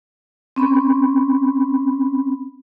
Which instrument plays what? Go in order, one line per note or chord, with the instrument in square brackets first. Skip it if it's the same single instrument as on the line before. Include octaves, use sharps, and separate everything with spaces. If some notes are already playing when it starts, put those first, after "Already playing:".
[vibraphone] C4 C#4 B5